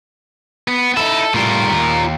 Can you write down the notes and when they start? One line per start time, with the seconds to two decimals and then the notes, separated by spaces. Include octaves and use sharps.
0.68 B3
0.97 D#4 E4 A4
1.34 A2 G3 F4 A#4
1.72 D#2